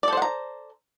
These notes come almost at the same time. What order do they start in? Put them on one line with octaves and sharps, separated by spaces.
D5 A4 C5 F#5 A#5